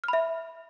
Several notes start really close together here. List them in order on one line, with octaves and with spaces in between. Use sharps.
F6 B5 E5